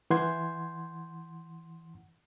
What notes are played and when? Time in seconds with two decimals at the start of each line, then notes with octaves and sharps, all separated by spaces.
0.10 E3 F#5 C6 G6 G#6